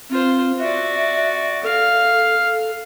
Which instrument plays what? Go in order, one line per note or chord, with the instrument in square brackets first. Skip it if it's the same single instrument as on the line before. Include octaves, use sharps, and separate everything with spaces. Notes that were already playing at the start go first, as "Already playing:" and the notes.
[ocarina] C4 [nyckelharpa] F4 C5
[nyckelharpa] F#4 D5 [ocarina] E5
[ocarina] A4 [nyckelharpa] F5